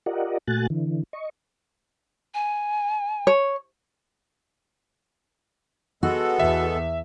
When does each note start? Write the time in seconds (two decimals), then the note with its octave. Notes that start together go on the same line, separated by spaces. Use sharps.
0.06 F4 G4 A#4 D5 D#5 F#5
0.47 A#2 A3 F#4 G#5 F#6 A6
0.70 D3 E3
1.13 D#5 C#6
2.34 G#5
3.27 C#5
6.03 G#3 B3 F#4 A4
6.40 E2 E5